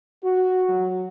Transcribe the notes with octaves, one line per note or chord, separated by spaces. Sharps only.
F#4
F#3